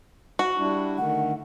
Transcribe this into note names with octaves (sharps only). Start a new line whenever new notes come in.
F#4
G3 D4 E4
D3 D#3 A3 F#5